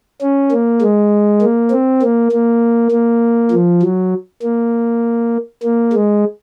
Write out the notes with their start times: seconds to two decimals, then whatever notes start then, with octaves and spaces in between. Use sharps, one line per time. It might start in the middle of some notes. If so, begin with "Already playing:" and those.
0.21 C#4
0.51 A#3
0.82 G#3
1.41 A#3
1.71 C4
2.02 A#3
2.32 A#3
2.91 A#3
3.52 F3
3.83 F#3
4.42 A#3
5.63 A#3
5.93 G#3